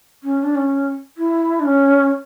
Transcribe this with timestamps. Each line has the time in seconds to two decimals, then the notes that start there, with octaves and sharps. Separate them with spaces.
0.23 C#4
0.43 D4
0.55 C#4
1.17 E4
1.60 D4
1.65 C#4